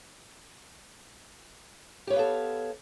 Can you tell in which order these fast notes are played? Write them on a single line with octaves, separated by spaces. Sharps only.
G4 C#5 B3 F5 A4